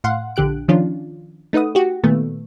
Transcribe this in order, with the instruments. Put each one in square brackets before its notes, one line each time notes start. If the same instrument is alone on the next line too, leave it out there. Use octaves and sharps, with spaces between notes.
[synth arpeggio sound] A2 F5 F#5 C6
A#1 D3 G4 F#6 D7
D#3 F3 C#4 D4 F4
A3 D#4 B4 F#5 D#6
F#4 G4
A#2 D#3 A3 B3